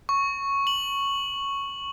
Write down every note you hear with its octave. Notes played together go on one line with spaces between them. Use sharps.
C#6
F#7